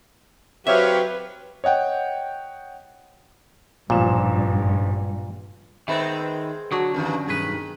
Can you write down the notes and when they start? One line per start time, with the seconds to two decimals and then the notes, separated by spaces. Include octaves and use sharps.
0.67 F#3 C4 G4 B4 C#5 E5 F5
1.64 C#5 D#5 F#5 G5
3.90 A1 G2 A#2 F3 E7
5.88 D#3 G#3 B3 C4 E5 B5
6.72 D3 F#3 F#4 A5 C#6 D#6
6.94 E2 G2 D#3 C#4
7.27 B1 G2 D#3 G#4 B4